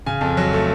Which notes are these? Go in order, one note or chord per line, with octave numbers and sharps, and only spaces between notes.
C#3 G#5
F2
F#3
A3